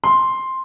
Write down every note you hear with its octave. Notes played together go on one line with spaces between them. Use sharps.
C6